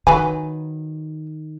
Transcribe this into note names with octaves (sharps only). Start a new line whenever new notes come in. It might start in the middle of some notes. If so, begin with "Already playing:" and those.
D#3 F#3 B4 G#5